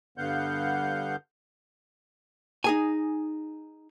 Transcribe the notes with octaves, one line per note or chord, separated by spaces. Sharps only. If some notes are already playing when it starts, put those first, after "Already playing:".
G2 D3 B3 F5 F#5 G6
D#4 G#4 G#5